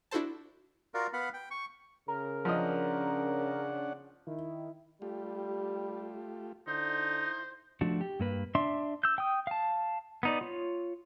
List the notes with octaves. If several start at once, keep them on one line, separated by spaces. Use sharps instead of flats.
D4 E4 F#4 A4 C5 A5
F4 F#4 A#4 D5 F5
B3 F5 F#5 B5
G5
C#6
C#3 A#4
F3 C#4 D4 D#5 F#5
D#3 E4
G3 A3 F4 G4
D3 D#4 E4 C5
F3 A3 D4 F#4
G4
G2 A#3 B4
D4 E5 C6
E6 G6
G5 D#6
F5 A5
B3 D#4 D5
F4 C#5